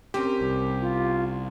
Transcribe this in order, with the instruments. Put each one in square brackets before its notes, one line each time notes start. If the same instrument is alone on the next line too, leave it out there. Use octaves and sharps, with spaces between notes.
[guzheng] C4 C#4 A#4 [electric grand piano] G4
[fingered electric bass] C2
[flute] F4